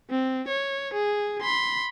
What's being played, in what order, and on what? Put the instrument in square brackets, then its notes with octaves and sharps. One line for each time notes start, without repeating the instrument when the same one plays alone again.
[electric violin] C4
C#5
G#4
B5 C6